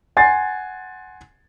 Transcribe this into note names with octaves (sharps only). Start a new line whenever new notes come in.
F#5 G#5 C6 A6 C7